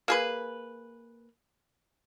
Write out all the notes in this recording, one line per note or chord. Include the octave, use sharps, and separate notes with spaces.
A#3 G#4 B4